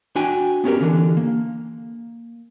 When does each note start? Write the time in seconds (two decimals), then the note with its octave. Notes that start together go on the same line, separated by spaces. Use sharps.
0.16 D4 F#4 G5 G#5
0.64 B3 C#4 G4 A#4
0.80 D3 E3 D4
1.17 A#3